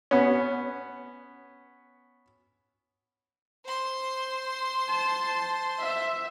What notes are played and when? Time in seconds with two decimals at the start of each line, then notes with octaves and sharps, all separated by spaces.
0.11 B3 C#4
3.65 C5 C6
4.88 A5
5.79 E5